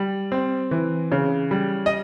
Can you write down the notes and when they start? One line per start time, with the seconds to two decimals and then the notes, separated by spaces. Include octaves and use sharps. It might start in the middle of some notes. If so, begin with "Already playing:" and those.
Already playing: G3
0.32 C4
0.71 E3
1.12 C#3
1.51 G3
1.86 D#5